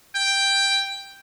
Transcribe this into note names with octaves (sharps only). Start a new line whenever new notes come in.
G5